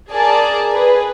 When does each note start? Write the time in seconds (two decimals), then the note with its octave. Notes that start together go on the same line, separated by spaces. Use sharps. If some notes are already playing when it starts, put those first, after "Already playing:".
0.11 G#4 A#4 D5 A5
0.73 G#4 B4